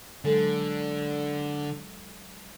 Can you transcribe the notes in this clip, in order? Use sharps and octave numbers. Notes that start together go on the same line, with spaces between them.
D3 F#3 G#3 A4